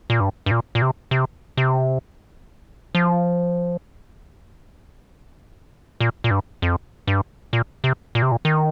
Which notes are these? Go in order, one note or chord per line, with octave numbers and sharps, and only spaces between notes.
A#2
G2
G2
A#2
A#2
C3
C3
C3
F3
A#2
A#2
G2
F2
G2
A#2
C3
A#2
C3
A#2
D#3